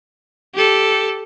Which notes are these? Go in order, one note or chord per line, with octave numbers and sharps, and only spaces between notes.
G4 A4